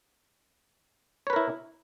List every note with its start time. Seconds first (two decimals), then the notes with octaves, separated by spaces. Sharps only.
1.27 C#5
1.30 B4
1.33 A#4
1.36 E4